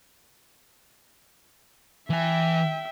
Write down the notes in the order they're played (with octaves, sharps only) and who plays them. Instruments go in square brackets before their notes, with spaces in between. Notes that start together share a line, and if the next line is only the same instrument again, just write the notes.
[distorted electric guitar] E3 G#5 [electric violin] E5 G5